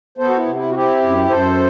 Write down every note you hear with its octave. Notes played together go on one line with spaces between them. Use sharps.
B3 A4 C5
F#4
E4
C3
E4
F#4
C4 E4 G4
F#2
F#2 A4 C5